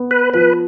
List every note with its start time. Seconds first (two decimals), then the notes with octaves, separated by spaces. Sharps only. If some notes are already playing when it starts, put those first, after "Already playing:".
Already playing: B3
0.11 B4
0.34 F3 B4